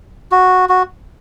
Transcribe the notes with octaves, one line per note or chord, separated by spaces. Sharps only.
F#4
F#4